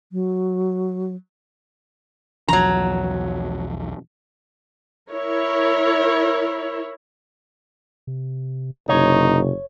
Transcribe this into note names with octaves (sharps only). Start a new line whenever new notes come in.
F#3
B1 E2 F3 F#3 A#5
E4 A#4 C#5
C3
F#1 C3 D#4 C#5